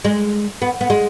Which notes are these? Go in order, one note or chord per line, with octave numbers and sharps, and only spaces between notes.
G#3
B3
B3
G#3